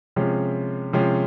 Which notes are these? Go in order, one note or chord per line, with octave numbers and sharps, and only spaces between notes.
C3 F3 G#3 C#4
C3 F3 G#3 C#4